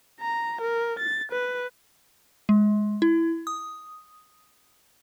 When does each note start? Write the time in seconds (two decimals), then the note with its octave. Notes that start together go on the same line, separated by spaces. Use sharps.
0.21 A#5
0.61 A#4
0.99 A6
1.32 B4
2.49 G#3
3.02 E4
3.47 D#6